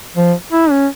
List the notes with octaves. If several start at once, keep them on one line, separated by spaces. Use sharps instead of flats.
F3
E4
C#4